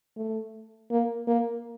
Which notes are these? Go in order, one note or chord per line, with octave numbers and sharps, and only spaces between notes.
A3
A#3
A#3